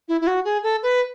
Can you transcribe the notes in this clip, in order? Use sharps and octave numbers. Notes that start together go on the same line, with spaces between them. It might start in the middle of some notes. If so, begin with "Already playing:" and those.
E4
E4
F#4
G#4
A4
B4